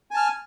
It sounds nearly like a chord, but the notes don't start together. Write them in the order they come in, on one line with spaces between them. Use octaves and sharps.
G#5 A5 F6